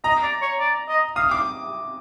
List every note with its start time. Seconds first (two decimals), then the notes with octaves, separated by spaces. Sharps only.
0.04 D#5 A#5
0.23 D5
0.42 C#5
0.60 D5
0.88 D#5
1.16 F5 D#6
1.31 D6